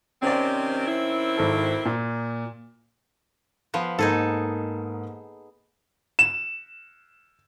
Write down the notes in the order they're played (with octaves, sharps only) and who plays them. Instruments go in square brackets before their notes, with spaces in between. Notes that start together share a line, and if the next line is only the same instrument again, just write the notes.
[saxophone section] C3 D#3 C4 [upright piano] C#4 D5
[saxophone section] D#3 C4 E4
[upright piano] G#1 A4
A#2
[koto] F3 B3
[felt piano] G#2 A#3 [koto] D#4 G#4 A4
[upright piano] E7